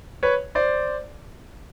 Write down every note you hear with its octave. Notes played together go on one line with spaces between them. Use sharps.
B4 C#5
C5 D5